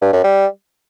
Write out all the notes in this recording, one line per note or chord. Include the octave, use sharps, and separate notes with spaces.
G2
F#2
G3